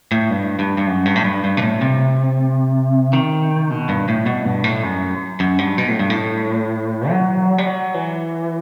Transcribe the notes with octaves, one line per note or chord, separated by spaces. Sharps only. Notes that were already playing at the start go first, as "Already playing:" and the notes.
A2
G2
G2
G2
F#2
G2
A2
G2
G2
B2
A2
C3
D#3
B2
G2
A2
B2
G2
A2
F#2
F#2
G2
B2
A2
G2
A2
F#3
G3
F#3
E3